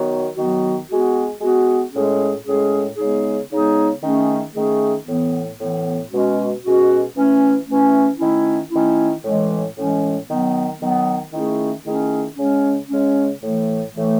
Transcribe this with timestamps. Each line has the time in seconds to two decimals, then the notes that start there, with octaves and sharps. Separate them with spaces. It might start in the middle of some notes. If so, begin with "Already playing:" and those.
Already playing: D#3 F#3 B3 F#4
0.36 D#3 F#3 B3 F#4
0.89 G#3 B3 F#4
1.41 G#3 B3 F#4
1.92 A2 G#3 C#4 G#4
2.45 A2 G#3 C#4 G#4
2.96 C#3 G#3 B3 D#4 G#4
3.50 C#3 G#3 B3 D#4 G#4
4.02 D#3 A3 C#4 G#4
4.53 D#3 A3 C#4 G#4
5.06 A2 E3 B3
5.58 A2 E3 B3
6.10 B2 G#3 C#4 F#4
6.62 B2 G#3 C#4 F#4
7.15 E3 A3 C#4
7.67 E3 A3 C#4
8.18 D#3 A3 C#4 E4
8.71 D#3 A3 C#4 E4
9.23 A2 E3 G#3 C#4
9.75 A2 E3 G#3 C#4
10.28 D#3 F#3 B3
10.79 D#3 F#3 B3
11.31 D#3 A3 C#4 E4 G#4
11.85 D#3 A3 C#4 E4 G#4
12.36 C#3 G#3 C#4
12.88 C#3 G#3 C#4
13.40 A2 E3 A3
13.93 A2 E3 A3